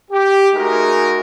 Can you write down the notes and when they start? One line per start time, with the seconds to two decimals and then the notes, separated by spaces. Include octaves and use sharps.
0.11 G4
0.55 G#3 A3 D#4 F#4 G#4 A#4